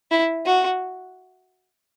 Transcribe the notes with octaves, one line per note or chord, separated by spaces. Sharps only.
E4
F#4